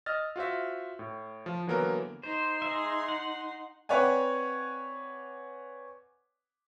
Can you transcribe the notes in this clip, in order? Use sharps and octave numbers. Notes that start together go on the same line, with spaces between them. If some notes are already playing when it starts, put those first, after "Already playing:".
D#5 E6 F6 A6
F4 F#4 C5 E5
A2
F3
D3 E3 F#3 A#3 B3 A#4
D#4 C5 C6
G#4 E5
F#5
C4 B4 C#5 D5 F#5 G#5